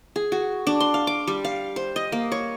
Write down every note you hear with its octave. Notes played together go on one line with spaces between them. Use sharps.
G#4
F#4
D4
C6
F5
D6
G3
F5
C5
D#5
A#3
C#5